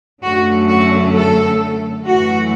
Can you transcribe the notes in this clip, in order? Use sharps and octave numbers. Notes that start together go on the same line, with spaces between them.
F#2 D3 F#3 A3 C#4 F#4
F#4
A4
F#2 E3 A3 F#4